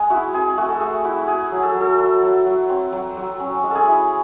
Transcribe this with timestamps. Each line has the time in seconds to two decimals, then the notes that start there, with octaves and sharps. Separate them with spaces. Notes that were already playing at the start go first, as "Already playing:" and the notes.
Already playing: G#3 G#4
0.10 E4 F#4
0.33 C4 G#4
0.57 A3 F#4
0.69 A4
0.80 A3 G#4
1.05 E4 F#4
1.28 E4 G#4
1.52 F#3
1.63 A4
1.75 F#3
1.81 A4
1.99 F#3
2.22 F#3
2.46 F#3
2.69 C4
2.93 F#3
3.17 F#3
3.40 C#4
3.64 G#3
3.71 G#4 A4
3.88 E4